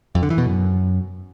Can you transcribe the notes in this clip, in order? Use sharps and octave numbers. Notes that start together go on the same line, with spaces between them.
F2
D3
E3
B2
F#2